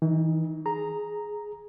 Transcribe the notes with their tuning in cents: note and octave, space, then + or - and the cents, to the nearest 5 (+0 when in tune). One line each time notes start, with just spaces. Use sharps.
E3 -35 D#4 +0
G#4 +5 A#5 +0